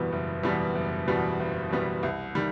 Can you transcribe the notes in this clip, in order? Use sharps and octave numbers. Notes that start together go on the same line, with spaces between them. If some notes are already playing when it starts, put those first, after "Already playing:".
Already playing: F#1 E2 B2 G3 B3
F#1
E2 B2 G3 B3
F#1
E2 B2 G3 B3
F#1
E2 B2 G3 B3
C2
D#3 G3